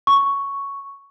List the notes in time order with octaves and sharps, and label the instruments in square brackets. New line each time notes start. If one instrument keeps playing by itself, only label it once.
[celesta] C#6